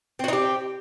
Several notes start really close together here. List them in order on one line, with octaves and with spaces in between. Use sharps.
C4 F#4 D#4 G4